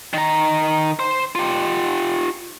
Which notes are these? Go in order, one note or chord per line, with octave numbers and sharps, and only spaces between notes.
D#3 A#5
C5
F4 G4